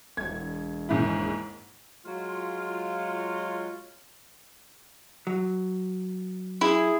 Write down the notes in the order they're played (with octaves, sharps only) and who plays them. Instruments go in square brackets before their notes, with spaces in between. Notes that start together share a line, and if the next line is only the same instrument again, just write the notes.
[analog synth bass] E1 [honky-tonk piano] G#6
[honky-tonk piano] D#2 G#2 E4
[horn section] F#3 G#3 F4
[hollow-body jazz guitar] F#3
[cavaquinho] E4 [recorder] G#4